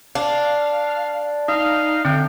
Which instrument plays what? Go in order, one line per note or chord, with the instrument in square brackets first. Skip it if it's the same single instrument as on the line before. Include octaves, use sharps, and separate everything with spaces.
[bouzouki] D4 [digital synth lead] F5
[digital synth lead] D#4 [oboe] F5 [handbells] D#6
[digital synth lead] D3 [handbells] C4 [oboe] G5